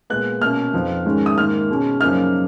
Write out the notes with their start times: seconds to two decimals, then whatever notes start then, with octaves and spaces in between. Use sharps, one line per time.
0.10 A#2 G#3 B3 F#6
0.42 B2 A#3 C#4 F6
0.74 F2 F3 B3 D#4
1.05 G#2 D#3 G#3 C#4
1.26 D#6
1.37 G#2 D#3 A#3 F6
1.69 B2 G#3 C#4
2.00 F#2 C#3 F3 A#3 D#4 F6